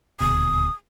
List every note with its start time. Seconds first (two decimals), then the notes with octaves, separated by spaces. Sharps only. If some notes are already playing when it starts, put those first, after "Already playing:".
0.20 D#1 D2 B2 D#6